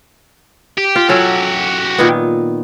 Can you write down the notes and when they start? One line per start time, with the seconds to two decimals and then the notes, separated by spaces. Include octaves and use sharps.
0.78 G4
0.96 F4
1.09 F#3 C#4 F#4 G4 A4
1.99 A#2 D#3 B3